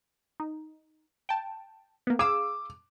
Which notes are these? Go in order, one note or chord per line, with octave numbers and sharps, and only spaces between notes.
D#4
G5 A5
A#3 B3
G#4 F5 D6 E6